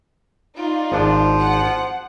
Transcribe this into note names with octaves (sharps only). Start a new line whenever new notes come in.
D#4 F4 D5
G#1 F3 D4
F#5